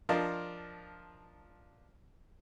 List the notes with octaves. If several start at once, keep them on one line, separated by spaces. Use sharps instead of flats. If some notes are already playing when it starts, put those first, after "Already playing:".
F3 D4 F4 A#4 D#5 F5